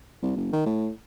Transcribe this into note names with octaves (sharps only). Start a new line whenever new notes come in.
C2
F#1
D#3
A2